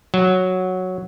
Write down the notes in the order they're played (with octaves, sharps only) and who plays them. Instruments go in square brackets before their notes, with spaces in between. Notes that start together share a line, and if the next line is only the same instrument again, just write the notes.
[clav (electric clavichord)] F#3